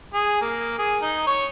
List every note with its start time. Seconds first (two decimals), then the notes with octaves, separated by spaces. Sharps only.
0.14 G#4
0.42 A#3
0.79 G#4
1.02 D#4
1.27 C#5